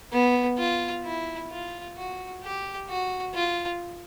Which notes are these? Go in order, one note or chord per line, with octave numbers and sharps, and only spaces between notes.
B3
F4
E4
F4
F#4
G4
F#4
F4